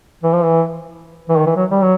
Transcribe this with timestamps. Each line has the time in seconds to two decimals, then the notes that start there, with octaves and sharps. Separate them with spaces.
0.23 E3
0.33 F3
0.43 E3
1.29 E3
1.38 D#3
1.46 E3
1.56 F#3
1.70 G3
1.82 F#3